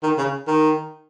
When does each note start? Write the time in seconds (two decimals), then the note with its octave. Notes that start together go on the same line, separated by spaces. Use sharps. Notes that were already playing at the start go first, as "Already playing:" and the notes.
0.03 D#3
0.18 C#3
0.47 D#3